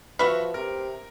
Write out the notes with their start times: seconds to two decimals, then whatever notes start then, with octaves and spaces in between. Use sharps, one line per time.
0.19 F3 F#4 B4 E5 C#6 F6
0.54 C3 A#4